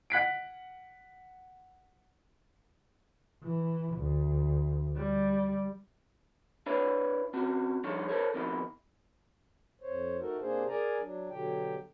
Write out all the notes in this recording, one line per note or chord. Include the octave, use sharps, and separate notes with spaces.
F#5 F#6 B6 D7
E3
D2
G3
D4 E4 B4 C#5 D5
C4 C#4 F#4
F3 G3 D4 D#4 A4 C#5
A4 A#4 C5 C#5
F2 B2 D#3 D#4 E4
F2 C5 C#5
A3 D#4 F#4 A4 A#4
C3 A#3 D4 G#4 C5
G#4 A#4 D5 G#5 A#5
F#3 D4
B2 D3 F#3 G4 G5